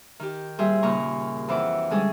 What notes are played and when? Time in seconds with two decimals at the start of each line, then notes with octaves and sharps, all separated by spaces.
0.20 D#3 G4
0.59 A#2 G3 G#4 C5 E5
0.82 D#2 A#2 C#3 A#5 C#6
1.48 F2 E3 E4 F#5 D6
1.90 D3 G3 G#3 C#4 G#4 A4